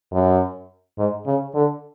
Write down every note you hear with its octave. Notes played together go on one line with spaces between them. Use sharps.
F#2
G#2
C#3
D3